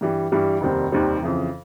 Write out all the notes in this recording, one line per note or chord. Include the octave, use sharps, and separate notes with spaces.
G2 E3 G3
G2 E3 G3
F1 D#2 D#3 G3 C4
F1 D#2 D#3 G3 C4
F2 C#3 E3